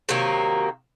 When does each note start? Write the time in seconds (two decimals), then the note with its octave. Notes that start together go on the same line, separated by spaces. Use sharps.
0.09 C3 D#3 F#3 A#3